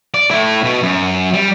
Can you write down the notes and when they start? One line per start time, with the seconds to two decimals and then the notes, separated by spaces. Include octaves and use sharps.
0.14 D5
0.31 A3 E4
0.64 B2
0.83 F#2
1.34 G3